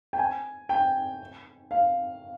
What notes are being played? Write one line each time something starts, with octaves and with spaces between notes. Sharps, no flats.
G5
G#5
G5
F5